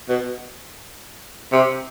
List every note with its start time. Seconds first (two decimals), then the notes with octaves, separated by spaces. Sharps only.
0.09 B2
1.52 C3